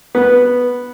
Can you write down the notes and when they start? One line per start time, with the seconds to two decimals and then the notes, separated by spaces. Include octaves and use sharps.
0.15 B3